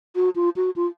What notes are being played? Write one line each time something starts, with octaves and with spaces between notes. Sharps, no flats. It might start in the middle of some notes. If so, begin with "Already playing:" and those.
F#4
F4
F#4
F4